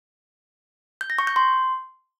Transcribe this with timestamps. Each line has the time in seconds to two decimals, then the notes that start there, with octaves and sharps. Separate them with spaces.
1.01 G6
1.10 A#6
1.19 C#6
1.27 G6
1.36 C6